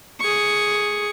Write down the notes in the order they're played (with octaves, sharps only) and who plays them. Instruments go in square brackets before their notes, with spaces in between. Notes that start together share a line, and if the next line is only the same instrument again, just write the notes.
[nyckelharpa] G#4 C#6